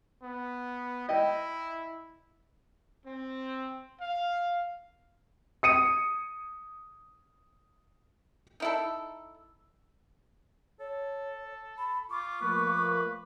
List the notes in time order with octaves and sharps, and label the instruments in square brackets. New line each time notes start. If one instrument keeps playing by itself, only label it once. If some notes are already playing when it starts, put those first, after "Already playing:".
[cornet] B3
[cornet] E4 [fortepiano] D#5 G5
[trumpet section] C4
F5
[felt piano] D#6 C#7 D#7
[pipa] D#4 E4 A4
[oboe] A4 [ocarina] C#5
[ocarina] B5
[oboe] F4 [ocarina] C#6 [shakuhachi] D6
[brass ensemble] F3 A3 A#3 [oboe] B4